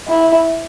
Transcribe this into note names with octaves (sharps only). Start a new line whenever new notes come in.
E4